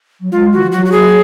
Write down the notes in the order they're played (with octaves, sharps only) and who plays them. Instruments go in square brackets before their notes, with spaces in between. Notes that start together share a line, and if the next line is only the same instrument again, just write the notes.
[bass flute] F#3
[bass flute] G#3 [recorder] F4
[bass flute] D#3 [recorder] F#4
[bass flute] F3
[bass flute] F#3 [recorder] F#4
[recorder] F#4
G#4